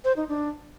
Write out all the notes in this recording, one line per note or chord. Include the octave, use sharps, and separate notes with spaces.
C5
D#4
D4